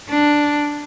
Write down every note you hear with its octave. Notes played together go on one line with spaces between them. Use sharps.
D4